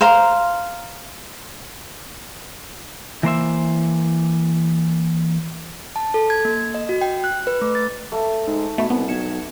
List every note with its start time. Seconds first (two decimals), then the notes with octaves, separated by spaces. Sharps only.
0.01 C5 F5 A#5 C6
3.23 E3 A#3 C5 E5
5.96 A5
6.14 A4
6.30 G#6
6.45 A#3
6.74 D#5
6.89 F#4
7.01 G5
7.24 F#6
7.47 B4
7.62 A3
7.75 A6
8.12 A3
8.47 G#2
8.78 B2 A3 C#5
8.90 C2 B3
9.08 B1 G#6 C#7 E7